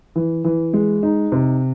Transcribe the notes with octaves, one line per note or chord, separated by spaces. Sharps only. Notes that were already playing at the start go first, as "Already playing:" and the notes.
E3
E3
G#3
D#4
C3